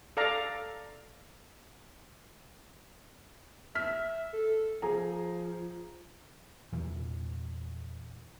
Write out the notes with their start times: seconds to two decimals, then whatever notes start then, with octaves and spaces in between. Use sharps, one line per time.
0.17 A4 D5 F5 A#5
3.75 E5 F6 B6
4.33 A4
4.82 F3 G#4 A#5
6.73 E2 A#2 E3